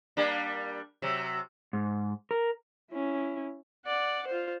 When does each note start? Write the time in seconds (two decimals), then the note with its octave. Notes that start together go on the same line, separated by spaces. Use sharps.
0.17 G3 A#3 D4
1.02 C3 F#3
1.73 G#2
2.31 A#4
2.91 C#4 E4
3.86 D5 F#5
4.27 F4 C5